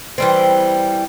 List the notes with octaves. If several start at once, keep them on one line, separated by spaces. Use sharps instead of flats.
E3 G3 C4